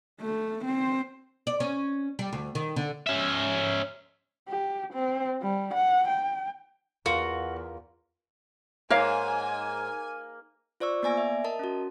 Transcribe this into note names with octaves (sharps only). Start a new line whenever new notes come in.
A3
C4 C5
D5
C#4
G3
D2
D#3
D3
C#4 E5
G4
C4
G3
F#5
G5
E2 F4 F#4 A#4 F5
G#2 A#3 A#4 C#5 F5 G#5
F4 C5 D5 C#6 E6
A#3 B3 D5 G#5 A#6 D7
E5
A#4 D#5 A5
C#4 F#4